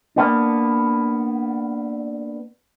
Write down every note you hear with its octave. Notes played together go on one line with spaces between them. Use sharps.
A#3 B3 D4